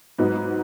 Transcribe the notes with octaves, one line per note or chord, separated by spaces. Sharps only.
G#2 F#3 B3 D#4